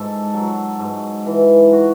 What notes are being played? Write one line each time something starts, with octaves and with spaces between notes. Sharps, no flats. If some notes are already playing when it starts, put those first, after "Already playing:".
Already playing: G#2 A4
F#3
G#2
E3
F#4